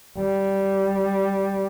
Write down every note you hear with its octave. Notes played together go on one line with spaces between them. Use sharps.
G3